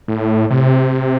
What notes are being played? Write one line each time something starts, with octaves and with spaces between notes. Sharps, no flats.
A2
C3